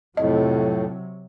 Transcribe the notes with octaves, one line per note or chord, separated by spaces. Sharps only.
F2 A2 C3 F#3 D#5